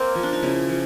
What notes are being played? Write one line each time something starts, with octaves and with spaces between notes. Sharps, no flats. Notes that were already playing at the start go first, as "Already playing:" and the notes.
Already playing: A#3 C4
F3
D4
D#4
C#3 E4
F3